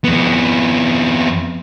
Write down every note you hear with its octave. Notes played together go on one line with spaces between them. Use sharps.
F2 B3